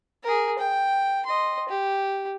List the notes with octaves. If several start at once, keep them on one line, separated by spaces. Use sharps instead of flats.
G#4 A#4
G5
D#5 C6
G4